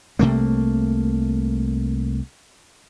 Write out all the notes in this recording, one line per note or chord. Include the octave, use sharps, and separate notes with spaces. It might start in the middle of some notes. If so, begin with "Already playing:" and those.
C2 C3 A3 A#3